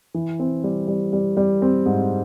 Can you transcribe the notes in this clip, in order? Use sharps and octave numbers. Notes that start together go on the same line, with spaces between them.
E3
C4
G3
G3
G3
G3
C4
G#2